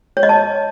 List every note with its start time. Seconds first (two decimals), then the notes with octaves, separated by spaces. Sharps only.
0.17 C#5
0.23 D#5
0.29 A5